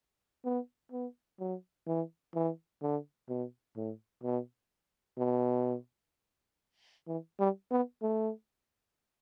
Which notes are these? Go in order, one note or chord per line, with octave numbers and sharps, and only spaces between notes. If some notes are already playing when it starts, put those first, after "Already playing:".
B3
B3
F#3
E3
E3
D3
B2
A2
B2
B2
E3
G3
B3
A3